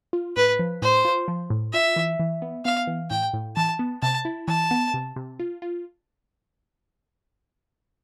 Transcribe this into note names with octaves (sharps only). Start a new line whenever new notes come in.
F4
A2 B4
F3
A2 C5
F4
F3
A2
F4 E5
E3
E3
B3
B3 F5
E3
A2 G5
A2
E3 A5
B3
C3 A5
E4
E3 A5
B3
C3
C3
F4
F4